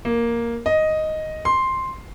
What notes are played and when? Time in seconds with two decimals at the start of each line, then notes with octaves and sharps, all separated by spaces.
0.05 A#3
0.66 D#5
1.45 C6